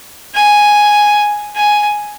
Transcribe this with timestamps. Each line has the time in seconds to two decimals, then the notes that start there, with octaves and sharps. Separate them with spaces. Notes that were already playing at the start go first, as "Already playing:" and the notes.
0.35 G#5
1.56 G#5